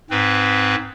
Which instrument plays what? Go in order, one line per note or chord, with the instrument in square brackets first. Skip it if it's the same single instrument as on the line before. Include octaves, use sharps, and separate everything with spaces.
[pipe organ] G#2 C4 B4